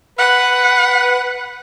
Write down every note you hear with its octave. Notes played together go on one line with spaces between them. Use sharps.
B4 F#5